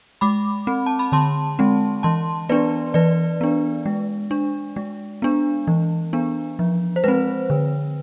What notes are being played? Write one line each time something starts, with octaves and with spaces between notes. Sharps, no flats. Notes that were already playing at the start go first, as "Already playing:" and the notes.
G#3 B5 D6
C4
A5
B5
D3 A5 C6
G#3 C4
E3 A5 C6
B3 D4 B4 D5
E3 B4 D5
B3 D4
G#3
D4
G#3
B3 D4
E3
B3 D4
F3
C5
G#3 C4 B4
D3